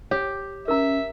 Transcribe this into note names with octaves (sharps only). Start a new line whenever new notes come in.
G4 C#5
C#4 A#4 E5 A#5